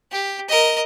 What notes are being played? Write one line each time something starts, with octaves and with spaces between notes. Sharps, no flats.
G4
A#4 D#5